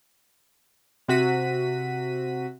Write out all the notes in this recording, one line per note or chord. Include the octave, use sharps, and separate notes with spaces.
C3 F#4 B6 D#7